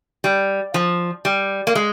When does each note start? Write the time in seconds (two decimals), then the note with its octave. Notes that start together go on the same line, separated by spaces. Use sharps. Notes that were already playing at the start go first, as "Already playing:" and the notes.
0.24 G3
0.74 F3
1.25 G3
1.67 A#3
1.75 G#3